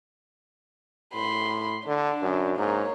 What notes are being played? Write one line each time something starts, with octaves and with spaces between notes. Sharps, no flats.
A2 B5 C6
D3 D4
F#2
G#2 A#3 C#5